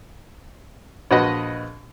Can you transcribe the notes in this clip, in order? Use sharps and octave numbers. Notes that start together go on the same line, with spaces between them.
A#1 F#4 B4 D#5